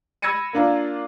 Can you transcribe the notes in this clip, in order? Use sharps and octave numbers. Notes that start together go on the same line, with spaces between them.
B5 E6 G#6 A#6 C#7 D#7
A#3 D4 F4 A#4